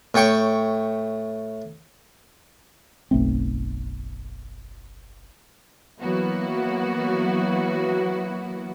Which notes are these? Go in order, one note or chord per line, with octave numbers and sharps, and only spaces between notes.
A2 C#5 G5 C#6
F#1 B1 A3 C4
E3 F#3 A#3 B3 E4 F#4